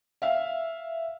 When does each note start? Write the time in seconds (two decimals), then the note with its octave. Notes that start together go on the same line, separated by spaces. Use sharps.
0.22 E5 F5